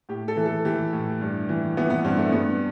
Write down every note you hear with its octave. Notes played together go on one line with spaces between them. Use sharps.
A2 G4
A4
E3
A4
E3 G4
A2
G2
E3
E3 B3
B3
G2 C4
A3
G2 B3